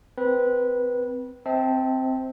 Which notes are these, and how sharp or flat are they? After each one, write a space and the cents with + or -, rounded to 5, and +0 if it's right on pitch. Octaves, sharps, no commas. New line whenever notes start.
C4 -25 B4 -20
C4 +0 E5 -45 A5 +0